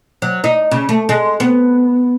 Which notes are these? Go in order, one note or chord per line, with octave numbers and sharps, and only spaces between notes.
F#3
D#4
C#3
A3
G#3
B3